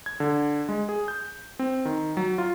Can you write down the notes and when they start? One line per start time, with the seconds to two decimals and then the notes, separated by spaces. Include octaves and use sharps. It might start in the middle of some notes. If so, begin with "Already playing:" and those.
0.06 G#6
0.20 D3
0.69 G#3
0.89 G#4
1.08 G6
1.59 C4
1.85 D#3
2.17 F#3
2.38 F4